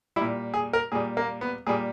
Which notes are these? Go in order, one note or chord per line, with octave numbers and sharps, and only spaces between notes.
A#2 G3 E4
G#4
A#4
A#2 G3 G#4
A#3
B3
A#2 G3 G#4